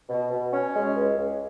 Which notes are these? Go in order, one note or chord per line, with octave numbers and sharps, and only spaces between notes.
B2
B2
C#4
G#3
C#2
C#2